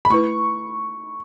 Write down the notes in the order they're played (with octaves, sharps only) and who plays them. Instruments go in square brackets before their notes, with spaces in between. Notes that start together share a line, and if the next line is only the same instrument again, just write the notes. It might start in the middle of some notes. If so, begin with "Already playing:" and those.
[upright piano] B5
[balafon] A3 E4 B4 [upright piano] C#6